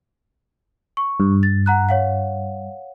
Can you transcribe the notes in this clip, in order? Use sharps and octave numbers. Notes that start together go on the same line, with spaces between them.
C#6
G2
A6
F#5 A#5 F#6
C#5 F5 F#5